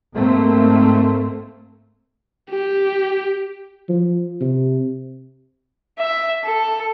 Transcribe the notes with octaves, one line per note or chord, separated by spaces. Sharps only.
G#2 A3 A#3 C4
G4
F3
C3
E5
A4